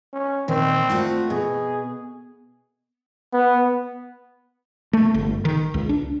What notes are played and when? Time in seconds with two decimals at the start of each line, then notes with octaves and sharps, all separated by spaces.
0.13 C#4
0.48 A#2 D#3 C4
0.90 A3 F4 F#4
1.30 B2 G#4
3.33 B3
4.93 A3
5.14 G1
5.45 D#3
5.74 C#2
5.89 D4